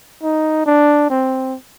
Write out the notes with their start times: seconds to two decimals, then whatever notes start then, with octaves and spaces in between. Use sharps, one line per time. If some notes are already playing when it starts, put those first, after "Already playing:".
0.23 D#4
0.66 D4
1.10 C4